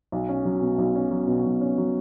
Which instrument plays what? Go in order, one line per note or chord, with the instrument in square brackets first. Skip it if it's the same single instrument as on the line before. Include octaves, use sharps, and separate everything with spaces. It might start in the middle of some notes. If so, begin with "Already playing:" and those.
[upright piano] B1
C#4
F#3
B2
B1
C#4
F#3
B2
B1
C#4
F#3